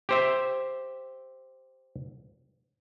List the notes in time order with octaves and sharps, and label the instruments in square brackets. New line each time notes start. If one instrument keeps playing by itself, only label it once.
[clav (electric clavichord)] G4 C5 E5